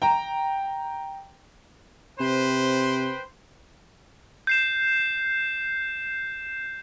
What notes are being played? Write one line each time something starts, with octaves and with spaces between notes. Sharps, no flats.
G5 A#5
C3 B4 C5 G5
G6 C7 E7